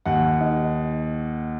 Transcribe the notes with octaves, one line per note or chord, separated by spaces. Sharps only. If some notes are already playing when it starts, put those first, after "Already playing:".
D#2 F#5
D#4